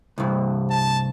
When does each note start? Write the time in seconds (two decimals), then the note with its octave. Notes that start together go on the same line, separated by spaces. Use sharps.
0.18 C2 G2
0.70 A5